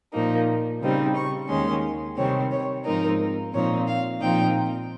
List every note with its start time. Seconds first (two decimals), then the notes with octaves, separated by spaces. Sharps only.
0.14 A#2 F3 A#3 D#4
0.81 C#3 G3 C4 D#4
1.16 C#6
1.49 D#2 D#3 G#3 C#4 C6
2.17 C3 D#3 G3 C4 C#5
2.52 C#5
2.85 G#2 F3 G#3 C4 D#4 A#4
3.53 A#2 F3 C4 D#4 C#5
3.87 F5
4.21 A#2 F3 C4 D#4 G5